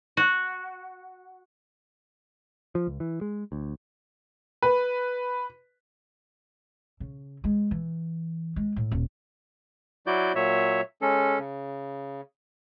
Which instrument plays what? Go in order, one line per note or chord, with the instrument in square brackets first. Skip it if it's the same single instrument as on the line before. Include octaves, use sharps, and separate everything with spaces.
[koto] F#4
[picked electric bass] F3
C#2
E3
G#3
D2
[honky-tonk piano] B4
[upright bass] C#3
G#3
E3
G#3
A2
D#1
[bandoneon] F#3 E4 F#4 D5 G6
A#2 F#3 C#5 E5
G#3 C#4 A4
C#3